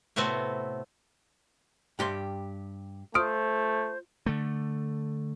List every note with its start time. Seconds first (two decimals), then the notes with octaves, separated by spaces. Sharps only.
0.16 A2 C3 A3 B3 C4 F#4
1.99 G2 G4 C6
3.15 A3 F4 C5 D#6 F6 D7
4.26 D3 A3